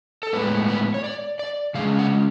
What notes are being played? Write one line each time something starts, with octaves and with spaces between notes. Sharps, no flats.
A4
A2 G#3 B3 B4
B4
C#5
D5
D5
C#3 G#3 C#4 F5
F#5